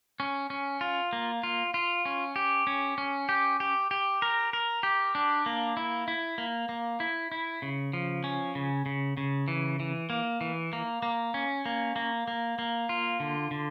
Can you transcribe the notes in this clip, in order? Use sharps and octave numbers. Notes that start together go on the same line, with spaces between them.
C#4
C#4
F4
A#3
F4
F4
C#4
G4
C#4
C#4
G4
G4
G4
A#4
A#4
G4
D4
A#3
E4
E4
A#3
A#3
E4
E4
C#3
F3
C#4
C#3
C#3
C#3
E3
E3
A#3
E3
A#3
A#3
C#4
A#3
A#3
A#3
A#3
F4
D3
D3